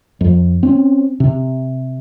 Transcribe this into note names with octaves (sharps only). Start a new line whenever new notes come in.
F2
C4 C#4
C3